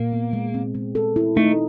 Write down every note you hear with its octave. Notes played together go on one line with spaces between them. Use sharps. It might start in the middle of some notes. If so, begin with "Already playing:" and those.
Already playing: A#2 A#3
B3
G#3
C4
G#3
A4
E4
A3 D#4